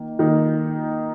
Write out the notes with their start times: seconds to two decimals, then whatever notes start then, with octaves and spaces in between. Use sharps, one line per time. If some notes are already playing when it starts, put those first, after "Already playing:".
Already playing: D#3 A#3
0.19 D#3 A#3 D#4